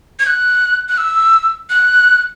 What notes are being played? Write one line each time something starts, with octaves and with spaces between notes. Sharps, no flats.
G#6
F#6
F#6
E6
F#6